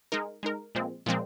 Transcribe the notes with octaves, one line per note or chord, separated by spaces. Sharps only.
G#3 D#4 A#4
G#3 D#4 A#4
A#2 F3 G#3 C4
A#2 F3 G#3 C4